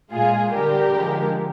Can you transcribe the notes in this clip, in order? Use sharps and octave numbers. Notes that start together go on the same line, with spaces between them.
A#2 G#3 F4 G#4
D3 G3 G4 A#4
D3 F3 G#3